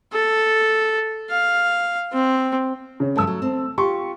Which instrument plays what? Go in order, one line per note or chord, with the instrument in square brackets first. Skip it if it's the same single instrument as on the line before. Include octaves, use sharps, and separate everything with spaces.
[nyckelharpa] A4
F5
C4
[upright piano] C#3 C#5
[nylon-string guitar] D2 G2 F3 [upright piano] A3 A5 E6
[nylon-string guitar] F#3
C4
[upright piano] F4 C6 C#6 [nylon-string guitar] G4